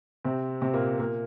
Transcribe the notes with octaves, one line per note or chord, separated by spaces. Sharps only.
C3 C4
C3 C4
A#2 A#3
A#2 A#3